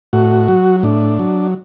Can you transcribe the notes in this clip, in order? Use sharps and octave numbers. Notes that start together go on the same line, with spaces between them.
A2 F#4
F#3
A2 D4
F#3